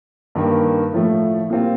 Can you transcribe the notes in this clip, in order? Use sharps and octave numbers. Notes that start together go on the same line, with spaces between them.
G2 D#3 A#3
A2 F3 A3
A#2 G3 C4 F4